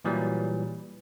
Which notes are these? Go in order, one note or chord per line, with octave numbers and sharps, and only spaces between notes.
A#2 E3 F#3 G3